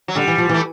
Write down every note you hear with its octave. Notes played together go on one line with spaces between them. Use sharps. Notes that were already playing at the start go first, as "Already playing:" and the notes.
F#3
D3 G3
E3
F3
E3 A3